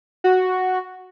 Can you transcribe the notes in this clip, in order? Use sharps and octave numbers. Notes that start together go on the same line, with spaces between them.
F#4